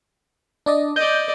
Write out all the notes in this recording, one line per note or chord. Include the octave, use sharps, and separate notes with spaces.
D4 D5 D#5
D5 D#5 G6